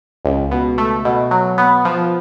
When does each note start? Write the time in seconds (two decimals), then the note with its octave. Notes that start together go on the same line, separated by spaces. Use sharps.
0.25 C#2
0.51 B2
0.78 A3
1.05 B2
1.31 F#3
1.58 B3
1.85 F3